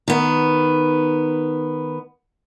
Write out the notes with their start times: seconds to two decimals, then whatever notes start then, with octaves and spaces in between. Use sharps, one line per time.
0.08 D#3 B3